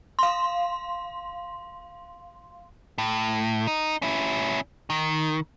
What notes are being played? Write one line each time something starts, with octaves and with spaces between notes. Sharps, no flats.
F5 C6
A2
D#4
C#4 E4
D#3